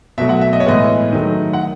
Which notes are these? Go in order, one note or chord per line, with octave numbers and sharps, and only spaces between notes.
B2 F#3 A3 E5
F#5
E5
D#5
C#5
A2 E3 G#3 B3 D#5
D#3 F#3 A3
F#5